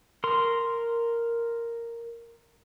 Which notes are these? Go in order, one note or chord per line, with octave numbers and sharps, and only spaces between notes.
A#4 C6